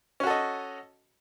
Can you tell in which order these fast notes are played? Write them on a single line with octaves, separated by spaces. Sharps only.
C#4 F#4 A4 D#5